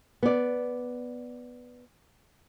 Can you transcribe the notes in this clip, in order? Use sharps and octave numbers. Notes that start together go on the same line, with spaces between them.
B3 D5